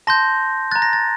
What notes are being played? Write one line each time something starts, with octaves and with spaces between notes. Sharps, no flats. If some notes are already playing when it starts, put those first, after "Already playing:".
A5 C6 G6 A#6
A#5 F#6 A6
A#6
A6